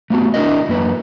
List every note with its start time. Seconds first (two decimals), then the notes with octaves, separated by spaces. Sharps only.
0.10 A3 B3 C4 F#4
0.34 D4 E4 G#4 A#4 D#5
0.69 F#2 A#3 B4